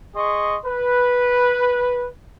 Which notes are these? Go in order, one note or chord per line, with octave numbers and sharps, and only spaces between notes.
G#4 D#5 C6 C#6
B4